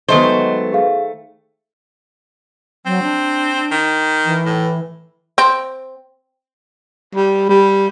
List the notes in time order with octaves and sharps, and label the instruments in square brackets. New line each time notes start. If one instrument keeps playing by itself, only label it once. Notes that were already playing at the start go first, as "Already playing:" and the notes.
[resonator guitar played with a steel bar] D#3 A3 C5 [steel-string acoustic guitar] F#3 G#3 B3 [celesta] D#5 G7
[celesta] G#4 F5
[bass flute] F#3 [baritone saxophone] C4
[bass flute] D4
[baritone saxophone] D#3
[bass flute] E3
[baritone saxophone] A2
[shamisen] C4
[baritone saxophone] G3
G3